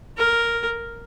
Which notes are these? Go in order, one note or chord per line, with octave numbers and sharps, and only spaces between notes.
A#4